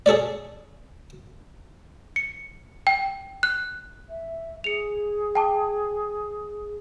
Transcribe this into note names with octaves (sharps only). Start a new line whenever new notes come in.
G#4 A4 C#5 D5
C#7
G5
F#6
E5
G#4 C#7 F7
G5 A5 D6